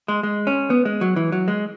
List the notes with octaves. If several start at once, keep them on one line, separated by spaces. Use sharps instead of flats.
G#3
G#3
C#4
B3
G#3
F#3
E3
F#3
G#3